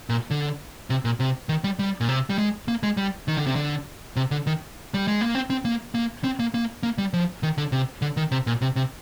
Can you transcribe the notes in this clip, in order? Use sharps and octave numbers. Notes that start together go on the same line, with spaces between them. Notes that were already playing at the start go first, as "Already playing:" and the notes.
A#2
D3
C3
A#2
C3
D#3
G3
G3
A#2
C3
G3
G#3
A#3
G#3
G3
D#3
D3
C3
D3
C3
D3
D#3
G3
G#3
A#3
C4
C4
A#3
A#3
C4
A#3
A#3
A#3
G3
F3
D#3
D3
C3
D3
D#3
C3
A#2
C3
C3